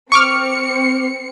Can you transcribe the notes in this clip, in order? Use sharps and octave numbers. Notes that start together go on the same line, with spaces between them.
C4 C#6 D6 F6 C#7